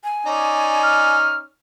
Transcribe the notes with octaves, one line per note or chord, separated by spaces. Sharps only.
G#5
C#4 D#4 D5
F6